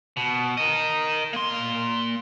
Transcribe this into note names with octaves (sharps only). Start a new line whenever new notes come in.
B2
A#4 D#5
A#3 C6